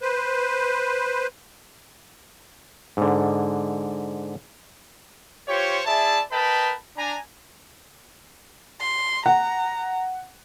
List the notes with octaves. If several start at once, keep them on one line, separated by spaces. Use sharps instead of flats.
B4 C5
G#2 D3
F4 G4 C5 C#5
E4 G#4 D5 E5 A5
A#4 B4 D#5 G5 A5 B5
D4 G#5 A#5
C6
F#5 A#5